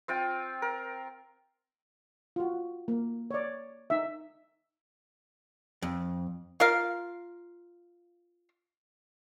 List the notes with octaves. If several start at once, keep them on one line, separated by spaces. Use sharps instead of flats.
C4 F4 G5
A#4
F4 F#4
A#3
C#5 D5
D#4 E5
F2
F4 A#4 F5